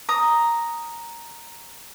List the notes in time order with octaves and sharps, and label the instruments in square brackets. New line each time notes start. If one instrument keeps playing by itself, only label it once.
[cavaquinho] A#5 D#6